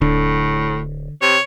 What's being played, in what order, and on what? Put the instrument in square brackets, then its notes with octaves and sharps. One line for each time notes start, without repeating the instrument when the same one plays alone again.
[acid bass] D1 [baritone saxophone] A2 [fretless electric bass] D3
[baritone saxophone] C3 [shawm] C#5